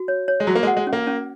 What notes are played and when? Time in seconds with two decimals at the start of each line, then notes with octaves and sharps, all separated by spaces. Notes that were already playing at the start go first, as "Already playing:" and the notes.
Already playing: F#4
0.08 C#5
0.28 C#5
0.40 G#3
0.47 F#3 F#4
0.55 A#3
0.63 G#3
0.67 F#5
0.77 G#3
0.87 C#4
0.93 A#3
1.07 C#4